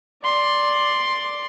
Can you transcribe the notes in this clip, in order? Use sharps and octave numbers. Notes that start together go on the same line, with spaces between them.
D5 C6